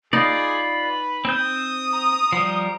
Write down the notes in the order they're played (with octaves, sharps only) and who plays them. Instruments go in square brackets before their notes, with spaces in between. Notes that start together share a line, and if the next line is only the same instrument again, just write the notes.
[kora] D#4 [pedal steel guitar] F4 D5 [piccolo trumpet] G#4 [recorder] B5
[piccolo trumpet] B4
[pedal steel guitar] C4 G6 [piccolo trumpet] D#6
[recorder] A#5
[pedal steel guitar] F3 G3